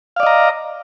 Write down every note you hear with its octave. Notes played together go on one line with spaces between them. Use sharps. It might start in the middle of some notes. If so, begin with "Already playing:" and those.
D5 D#5 F5 A#5